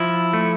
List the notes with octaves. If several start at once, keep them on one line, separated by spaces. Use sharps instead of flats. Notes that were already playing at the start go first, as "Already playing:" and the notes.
Already playing: F3 E4
A3